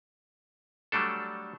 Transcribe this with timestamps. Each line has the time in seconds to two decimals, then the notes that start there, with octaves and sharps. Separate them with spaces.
0.92 F#3 G3 A3 D4 A4